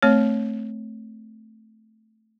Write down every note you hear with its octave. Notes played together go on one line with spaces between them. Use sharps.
A3 C4 C#5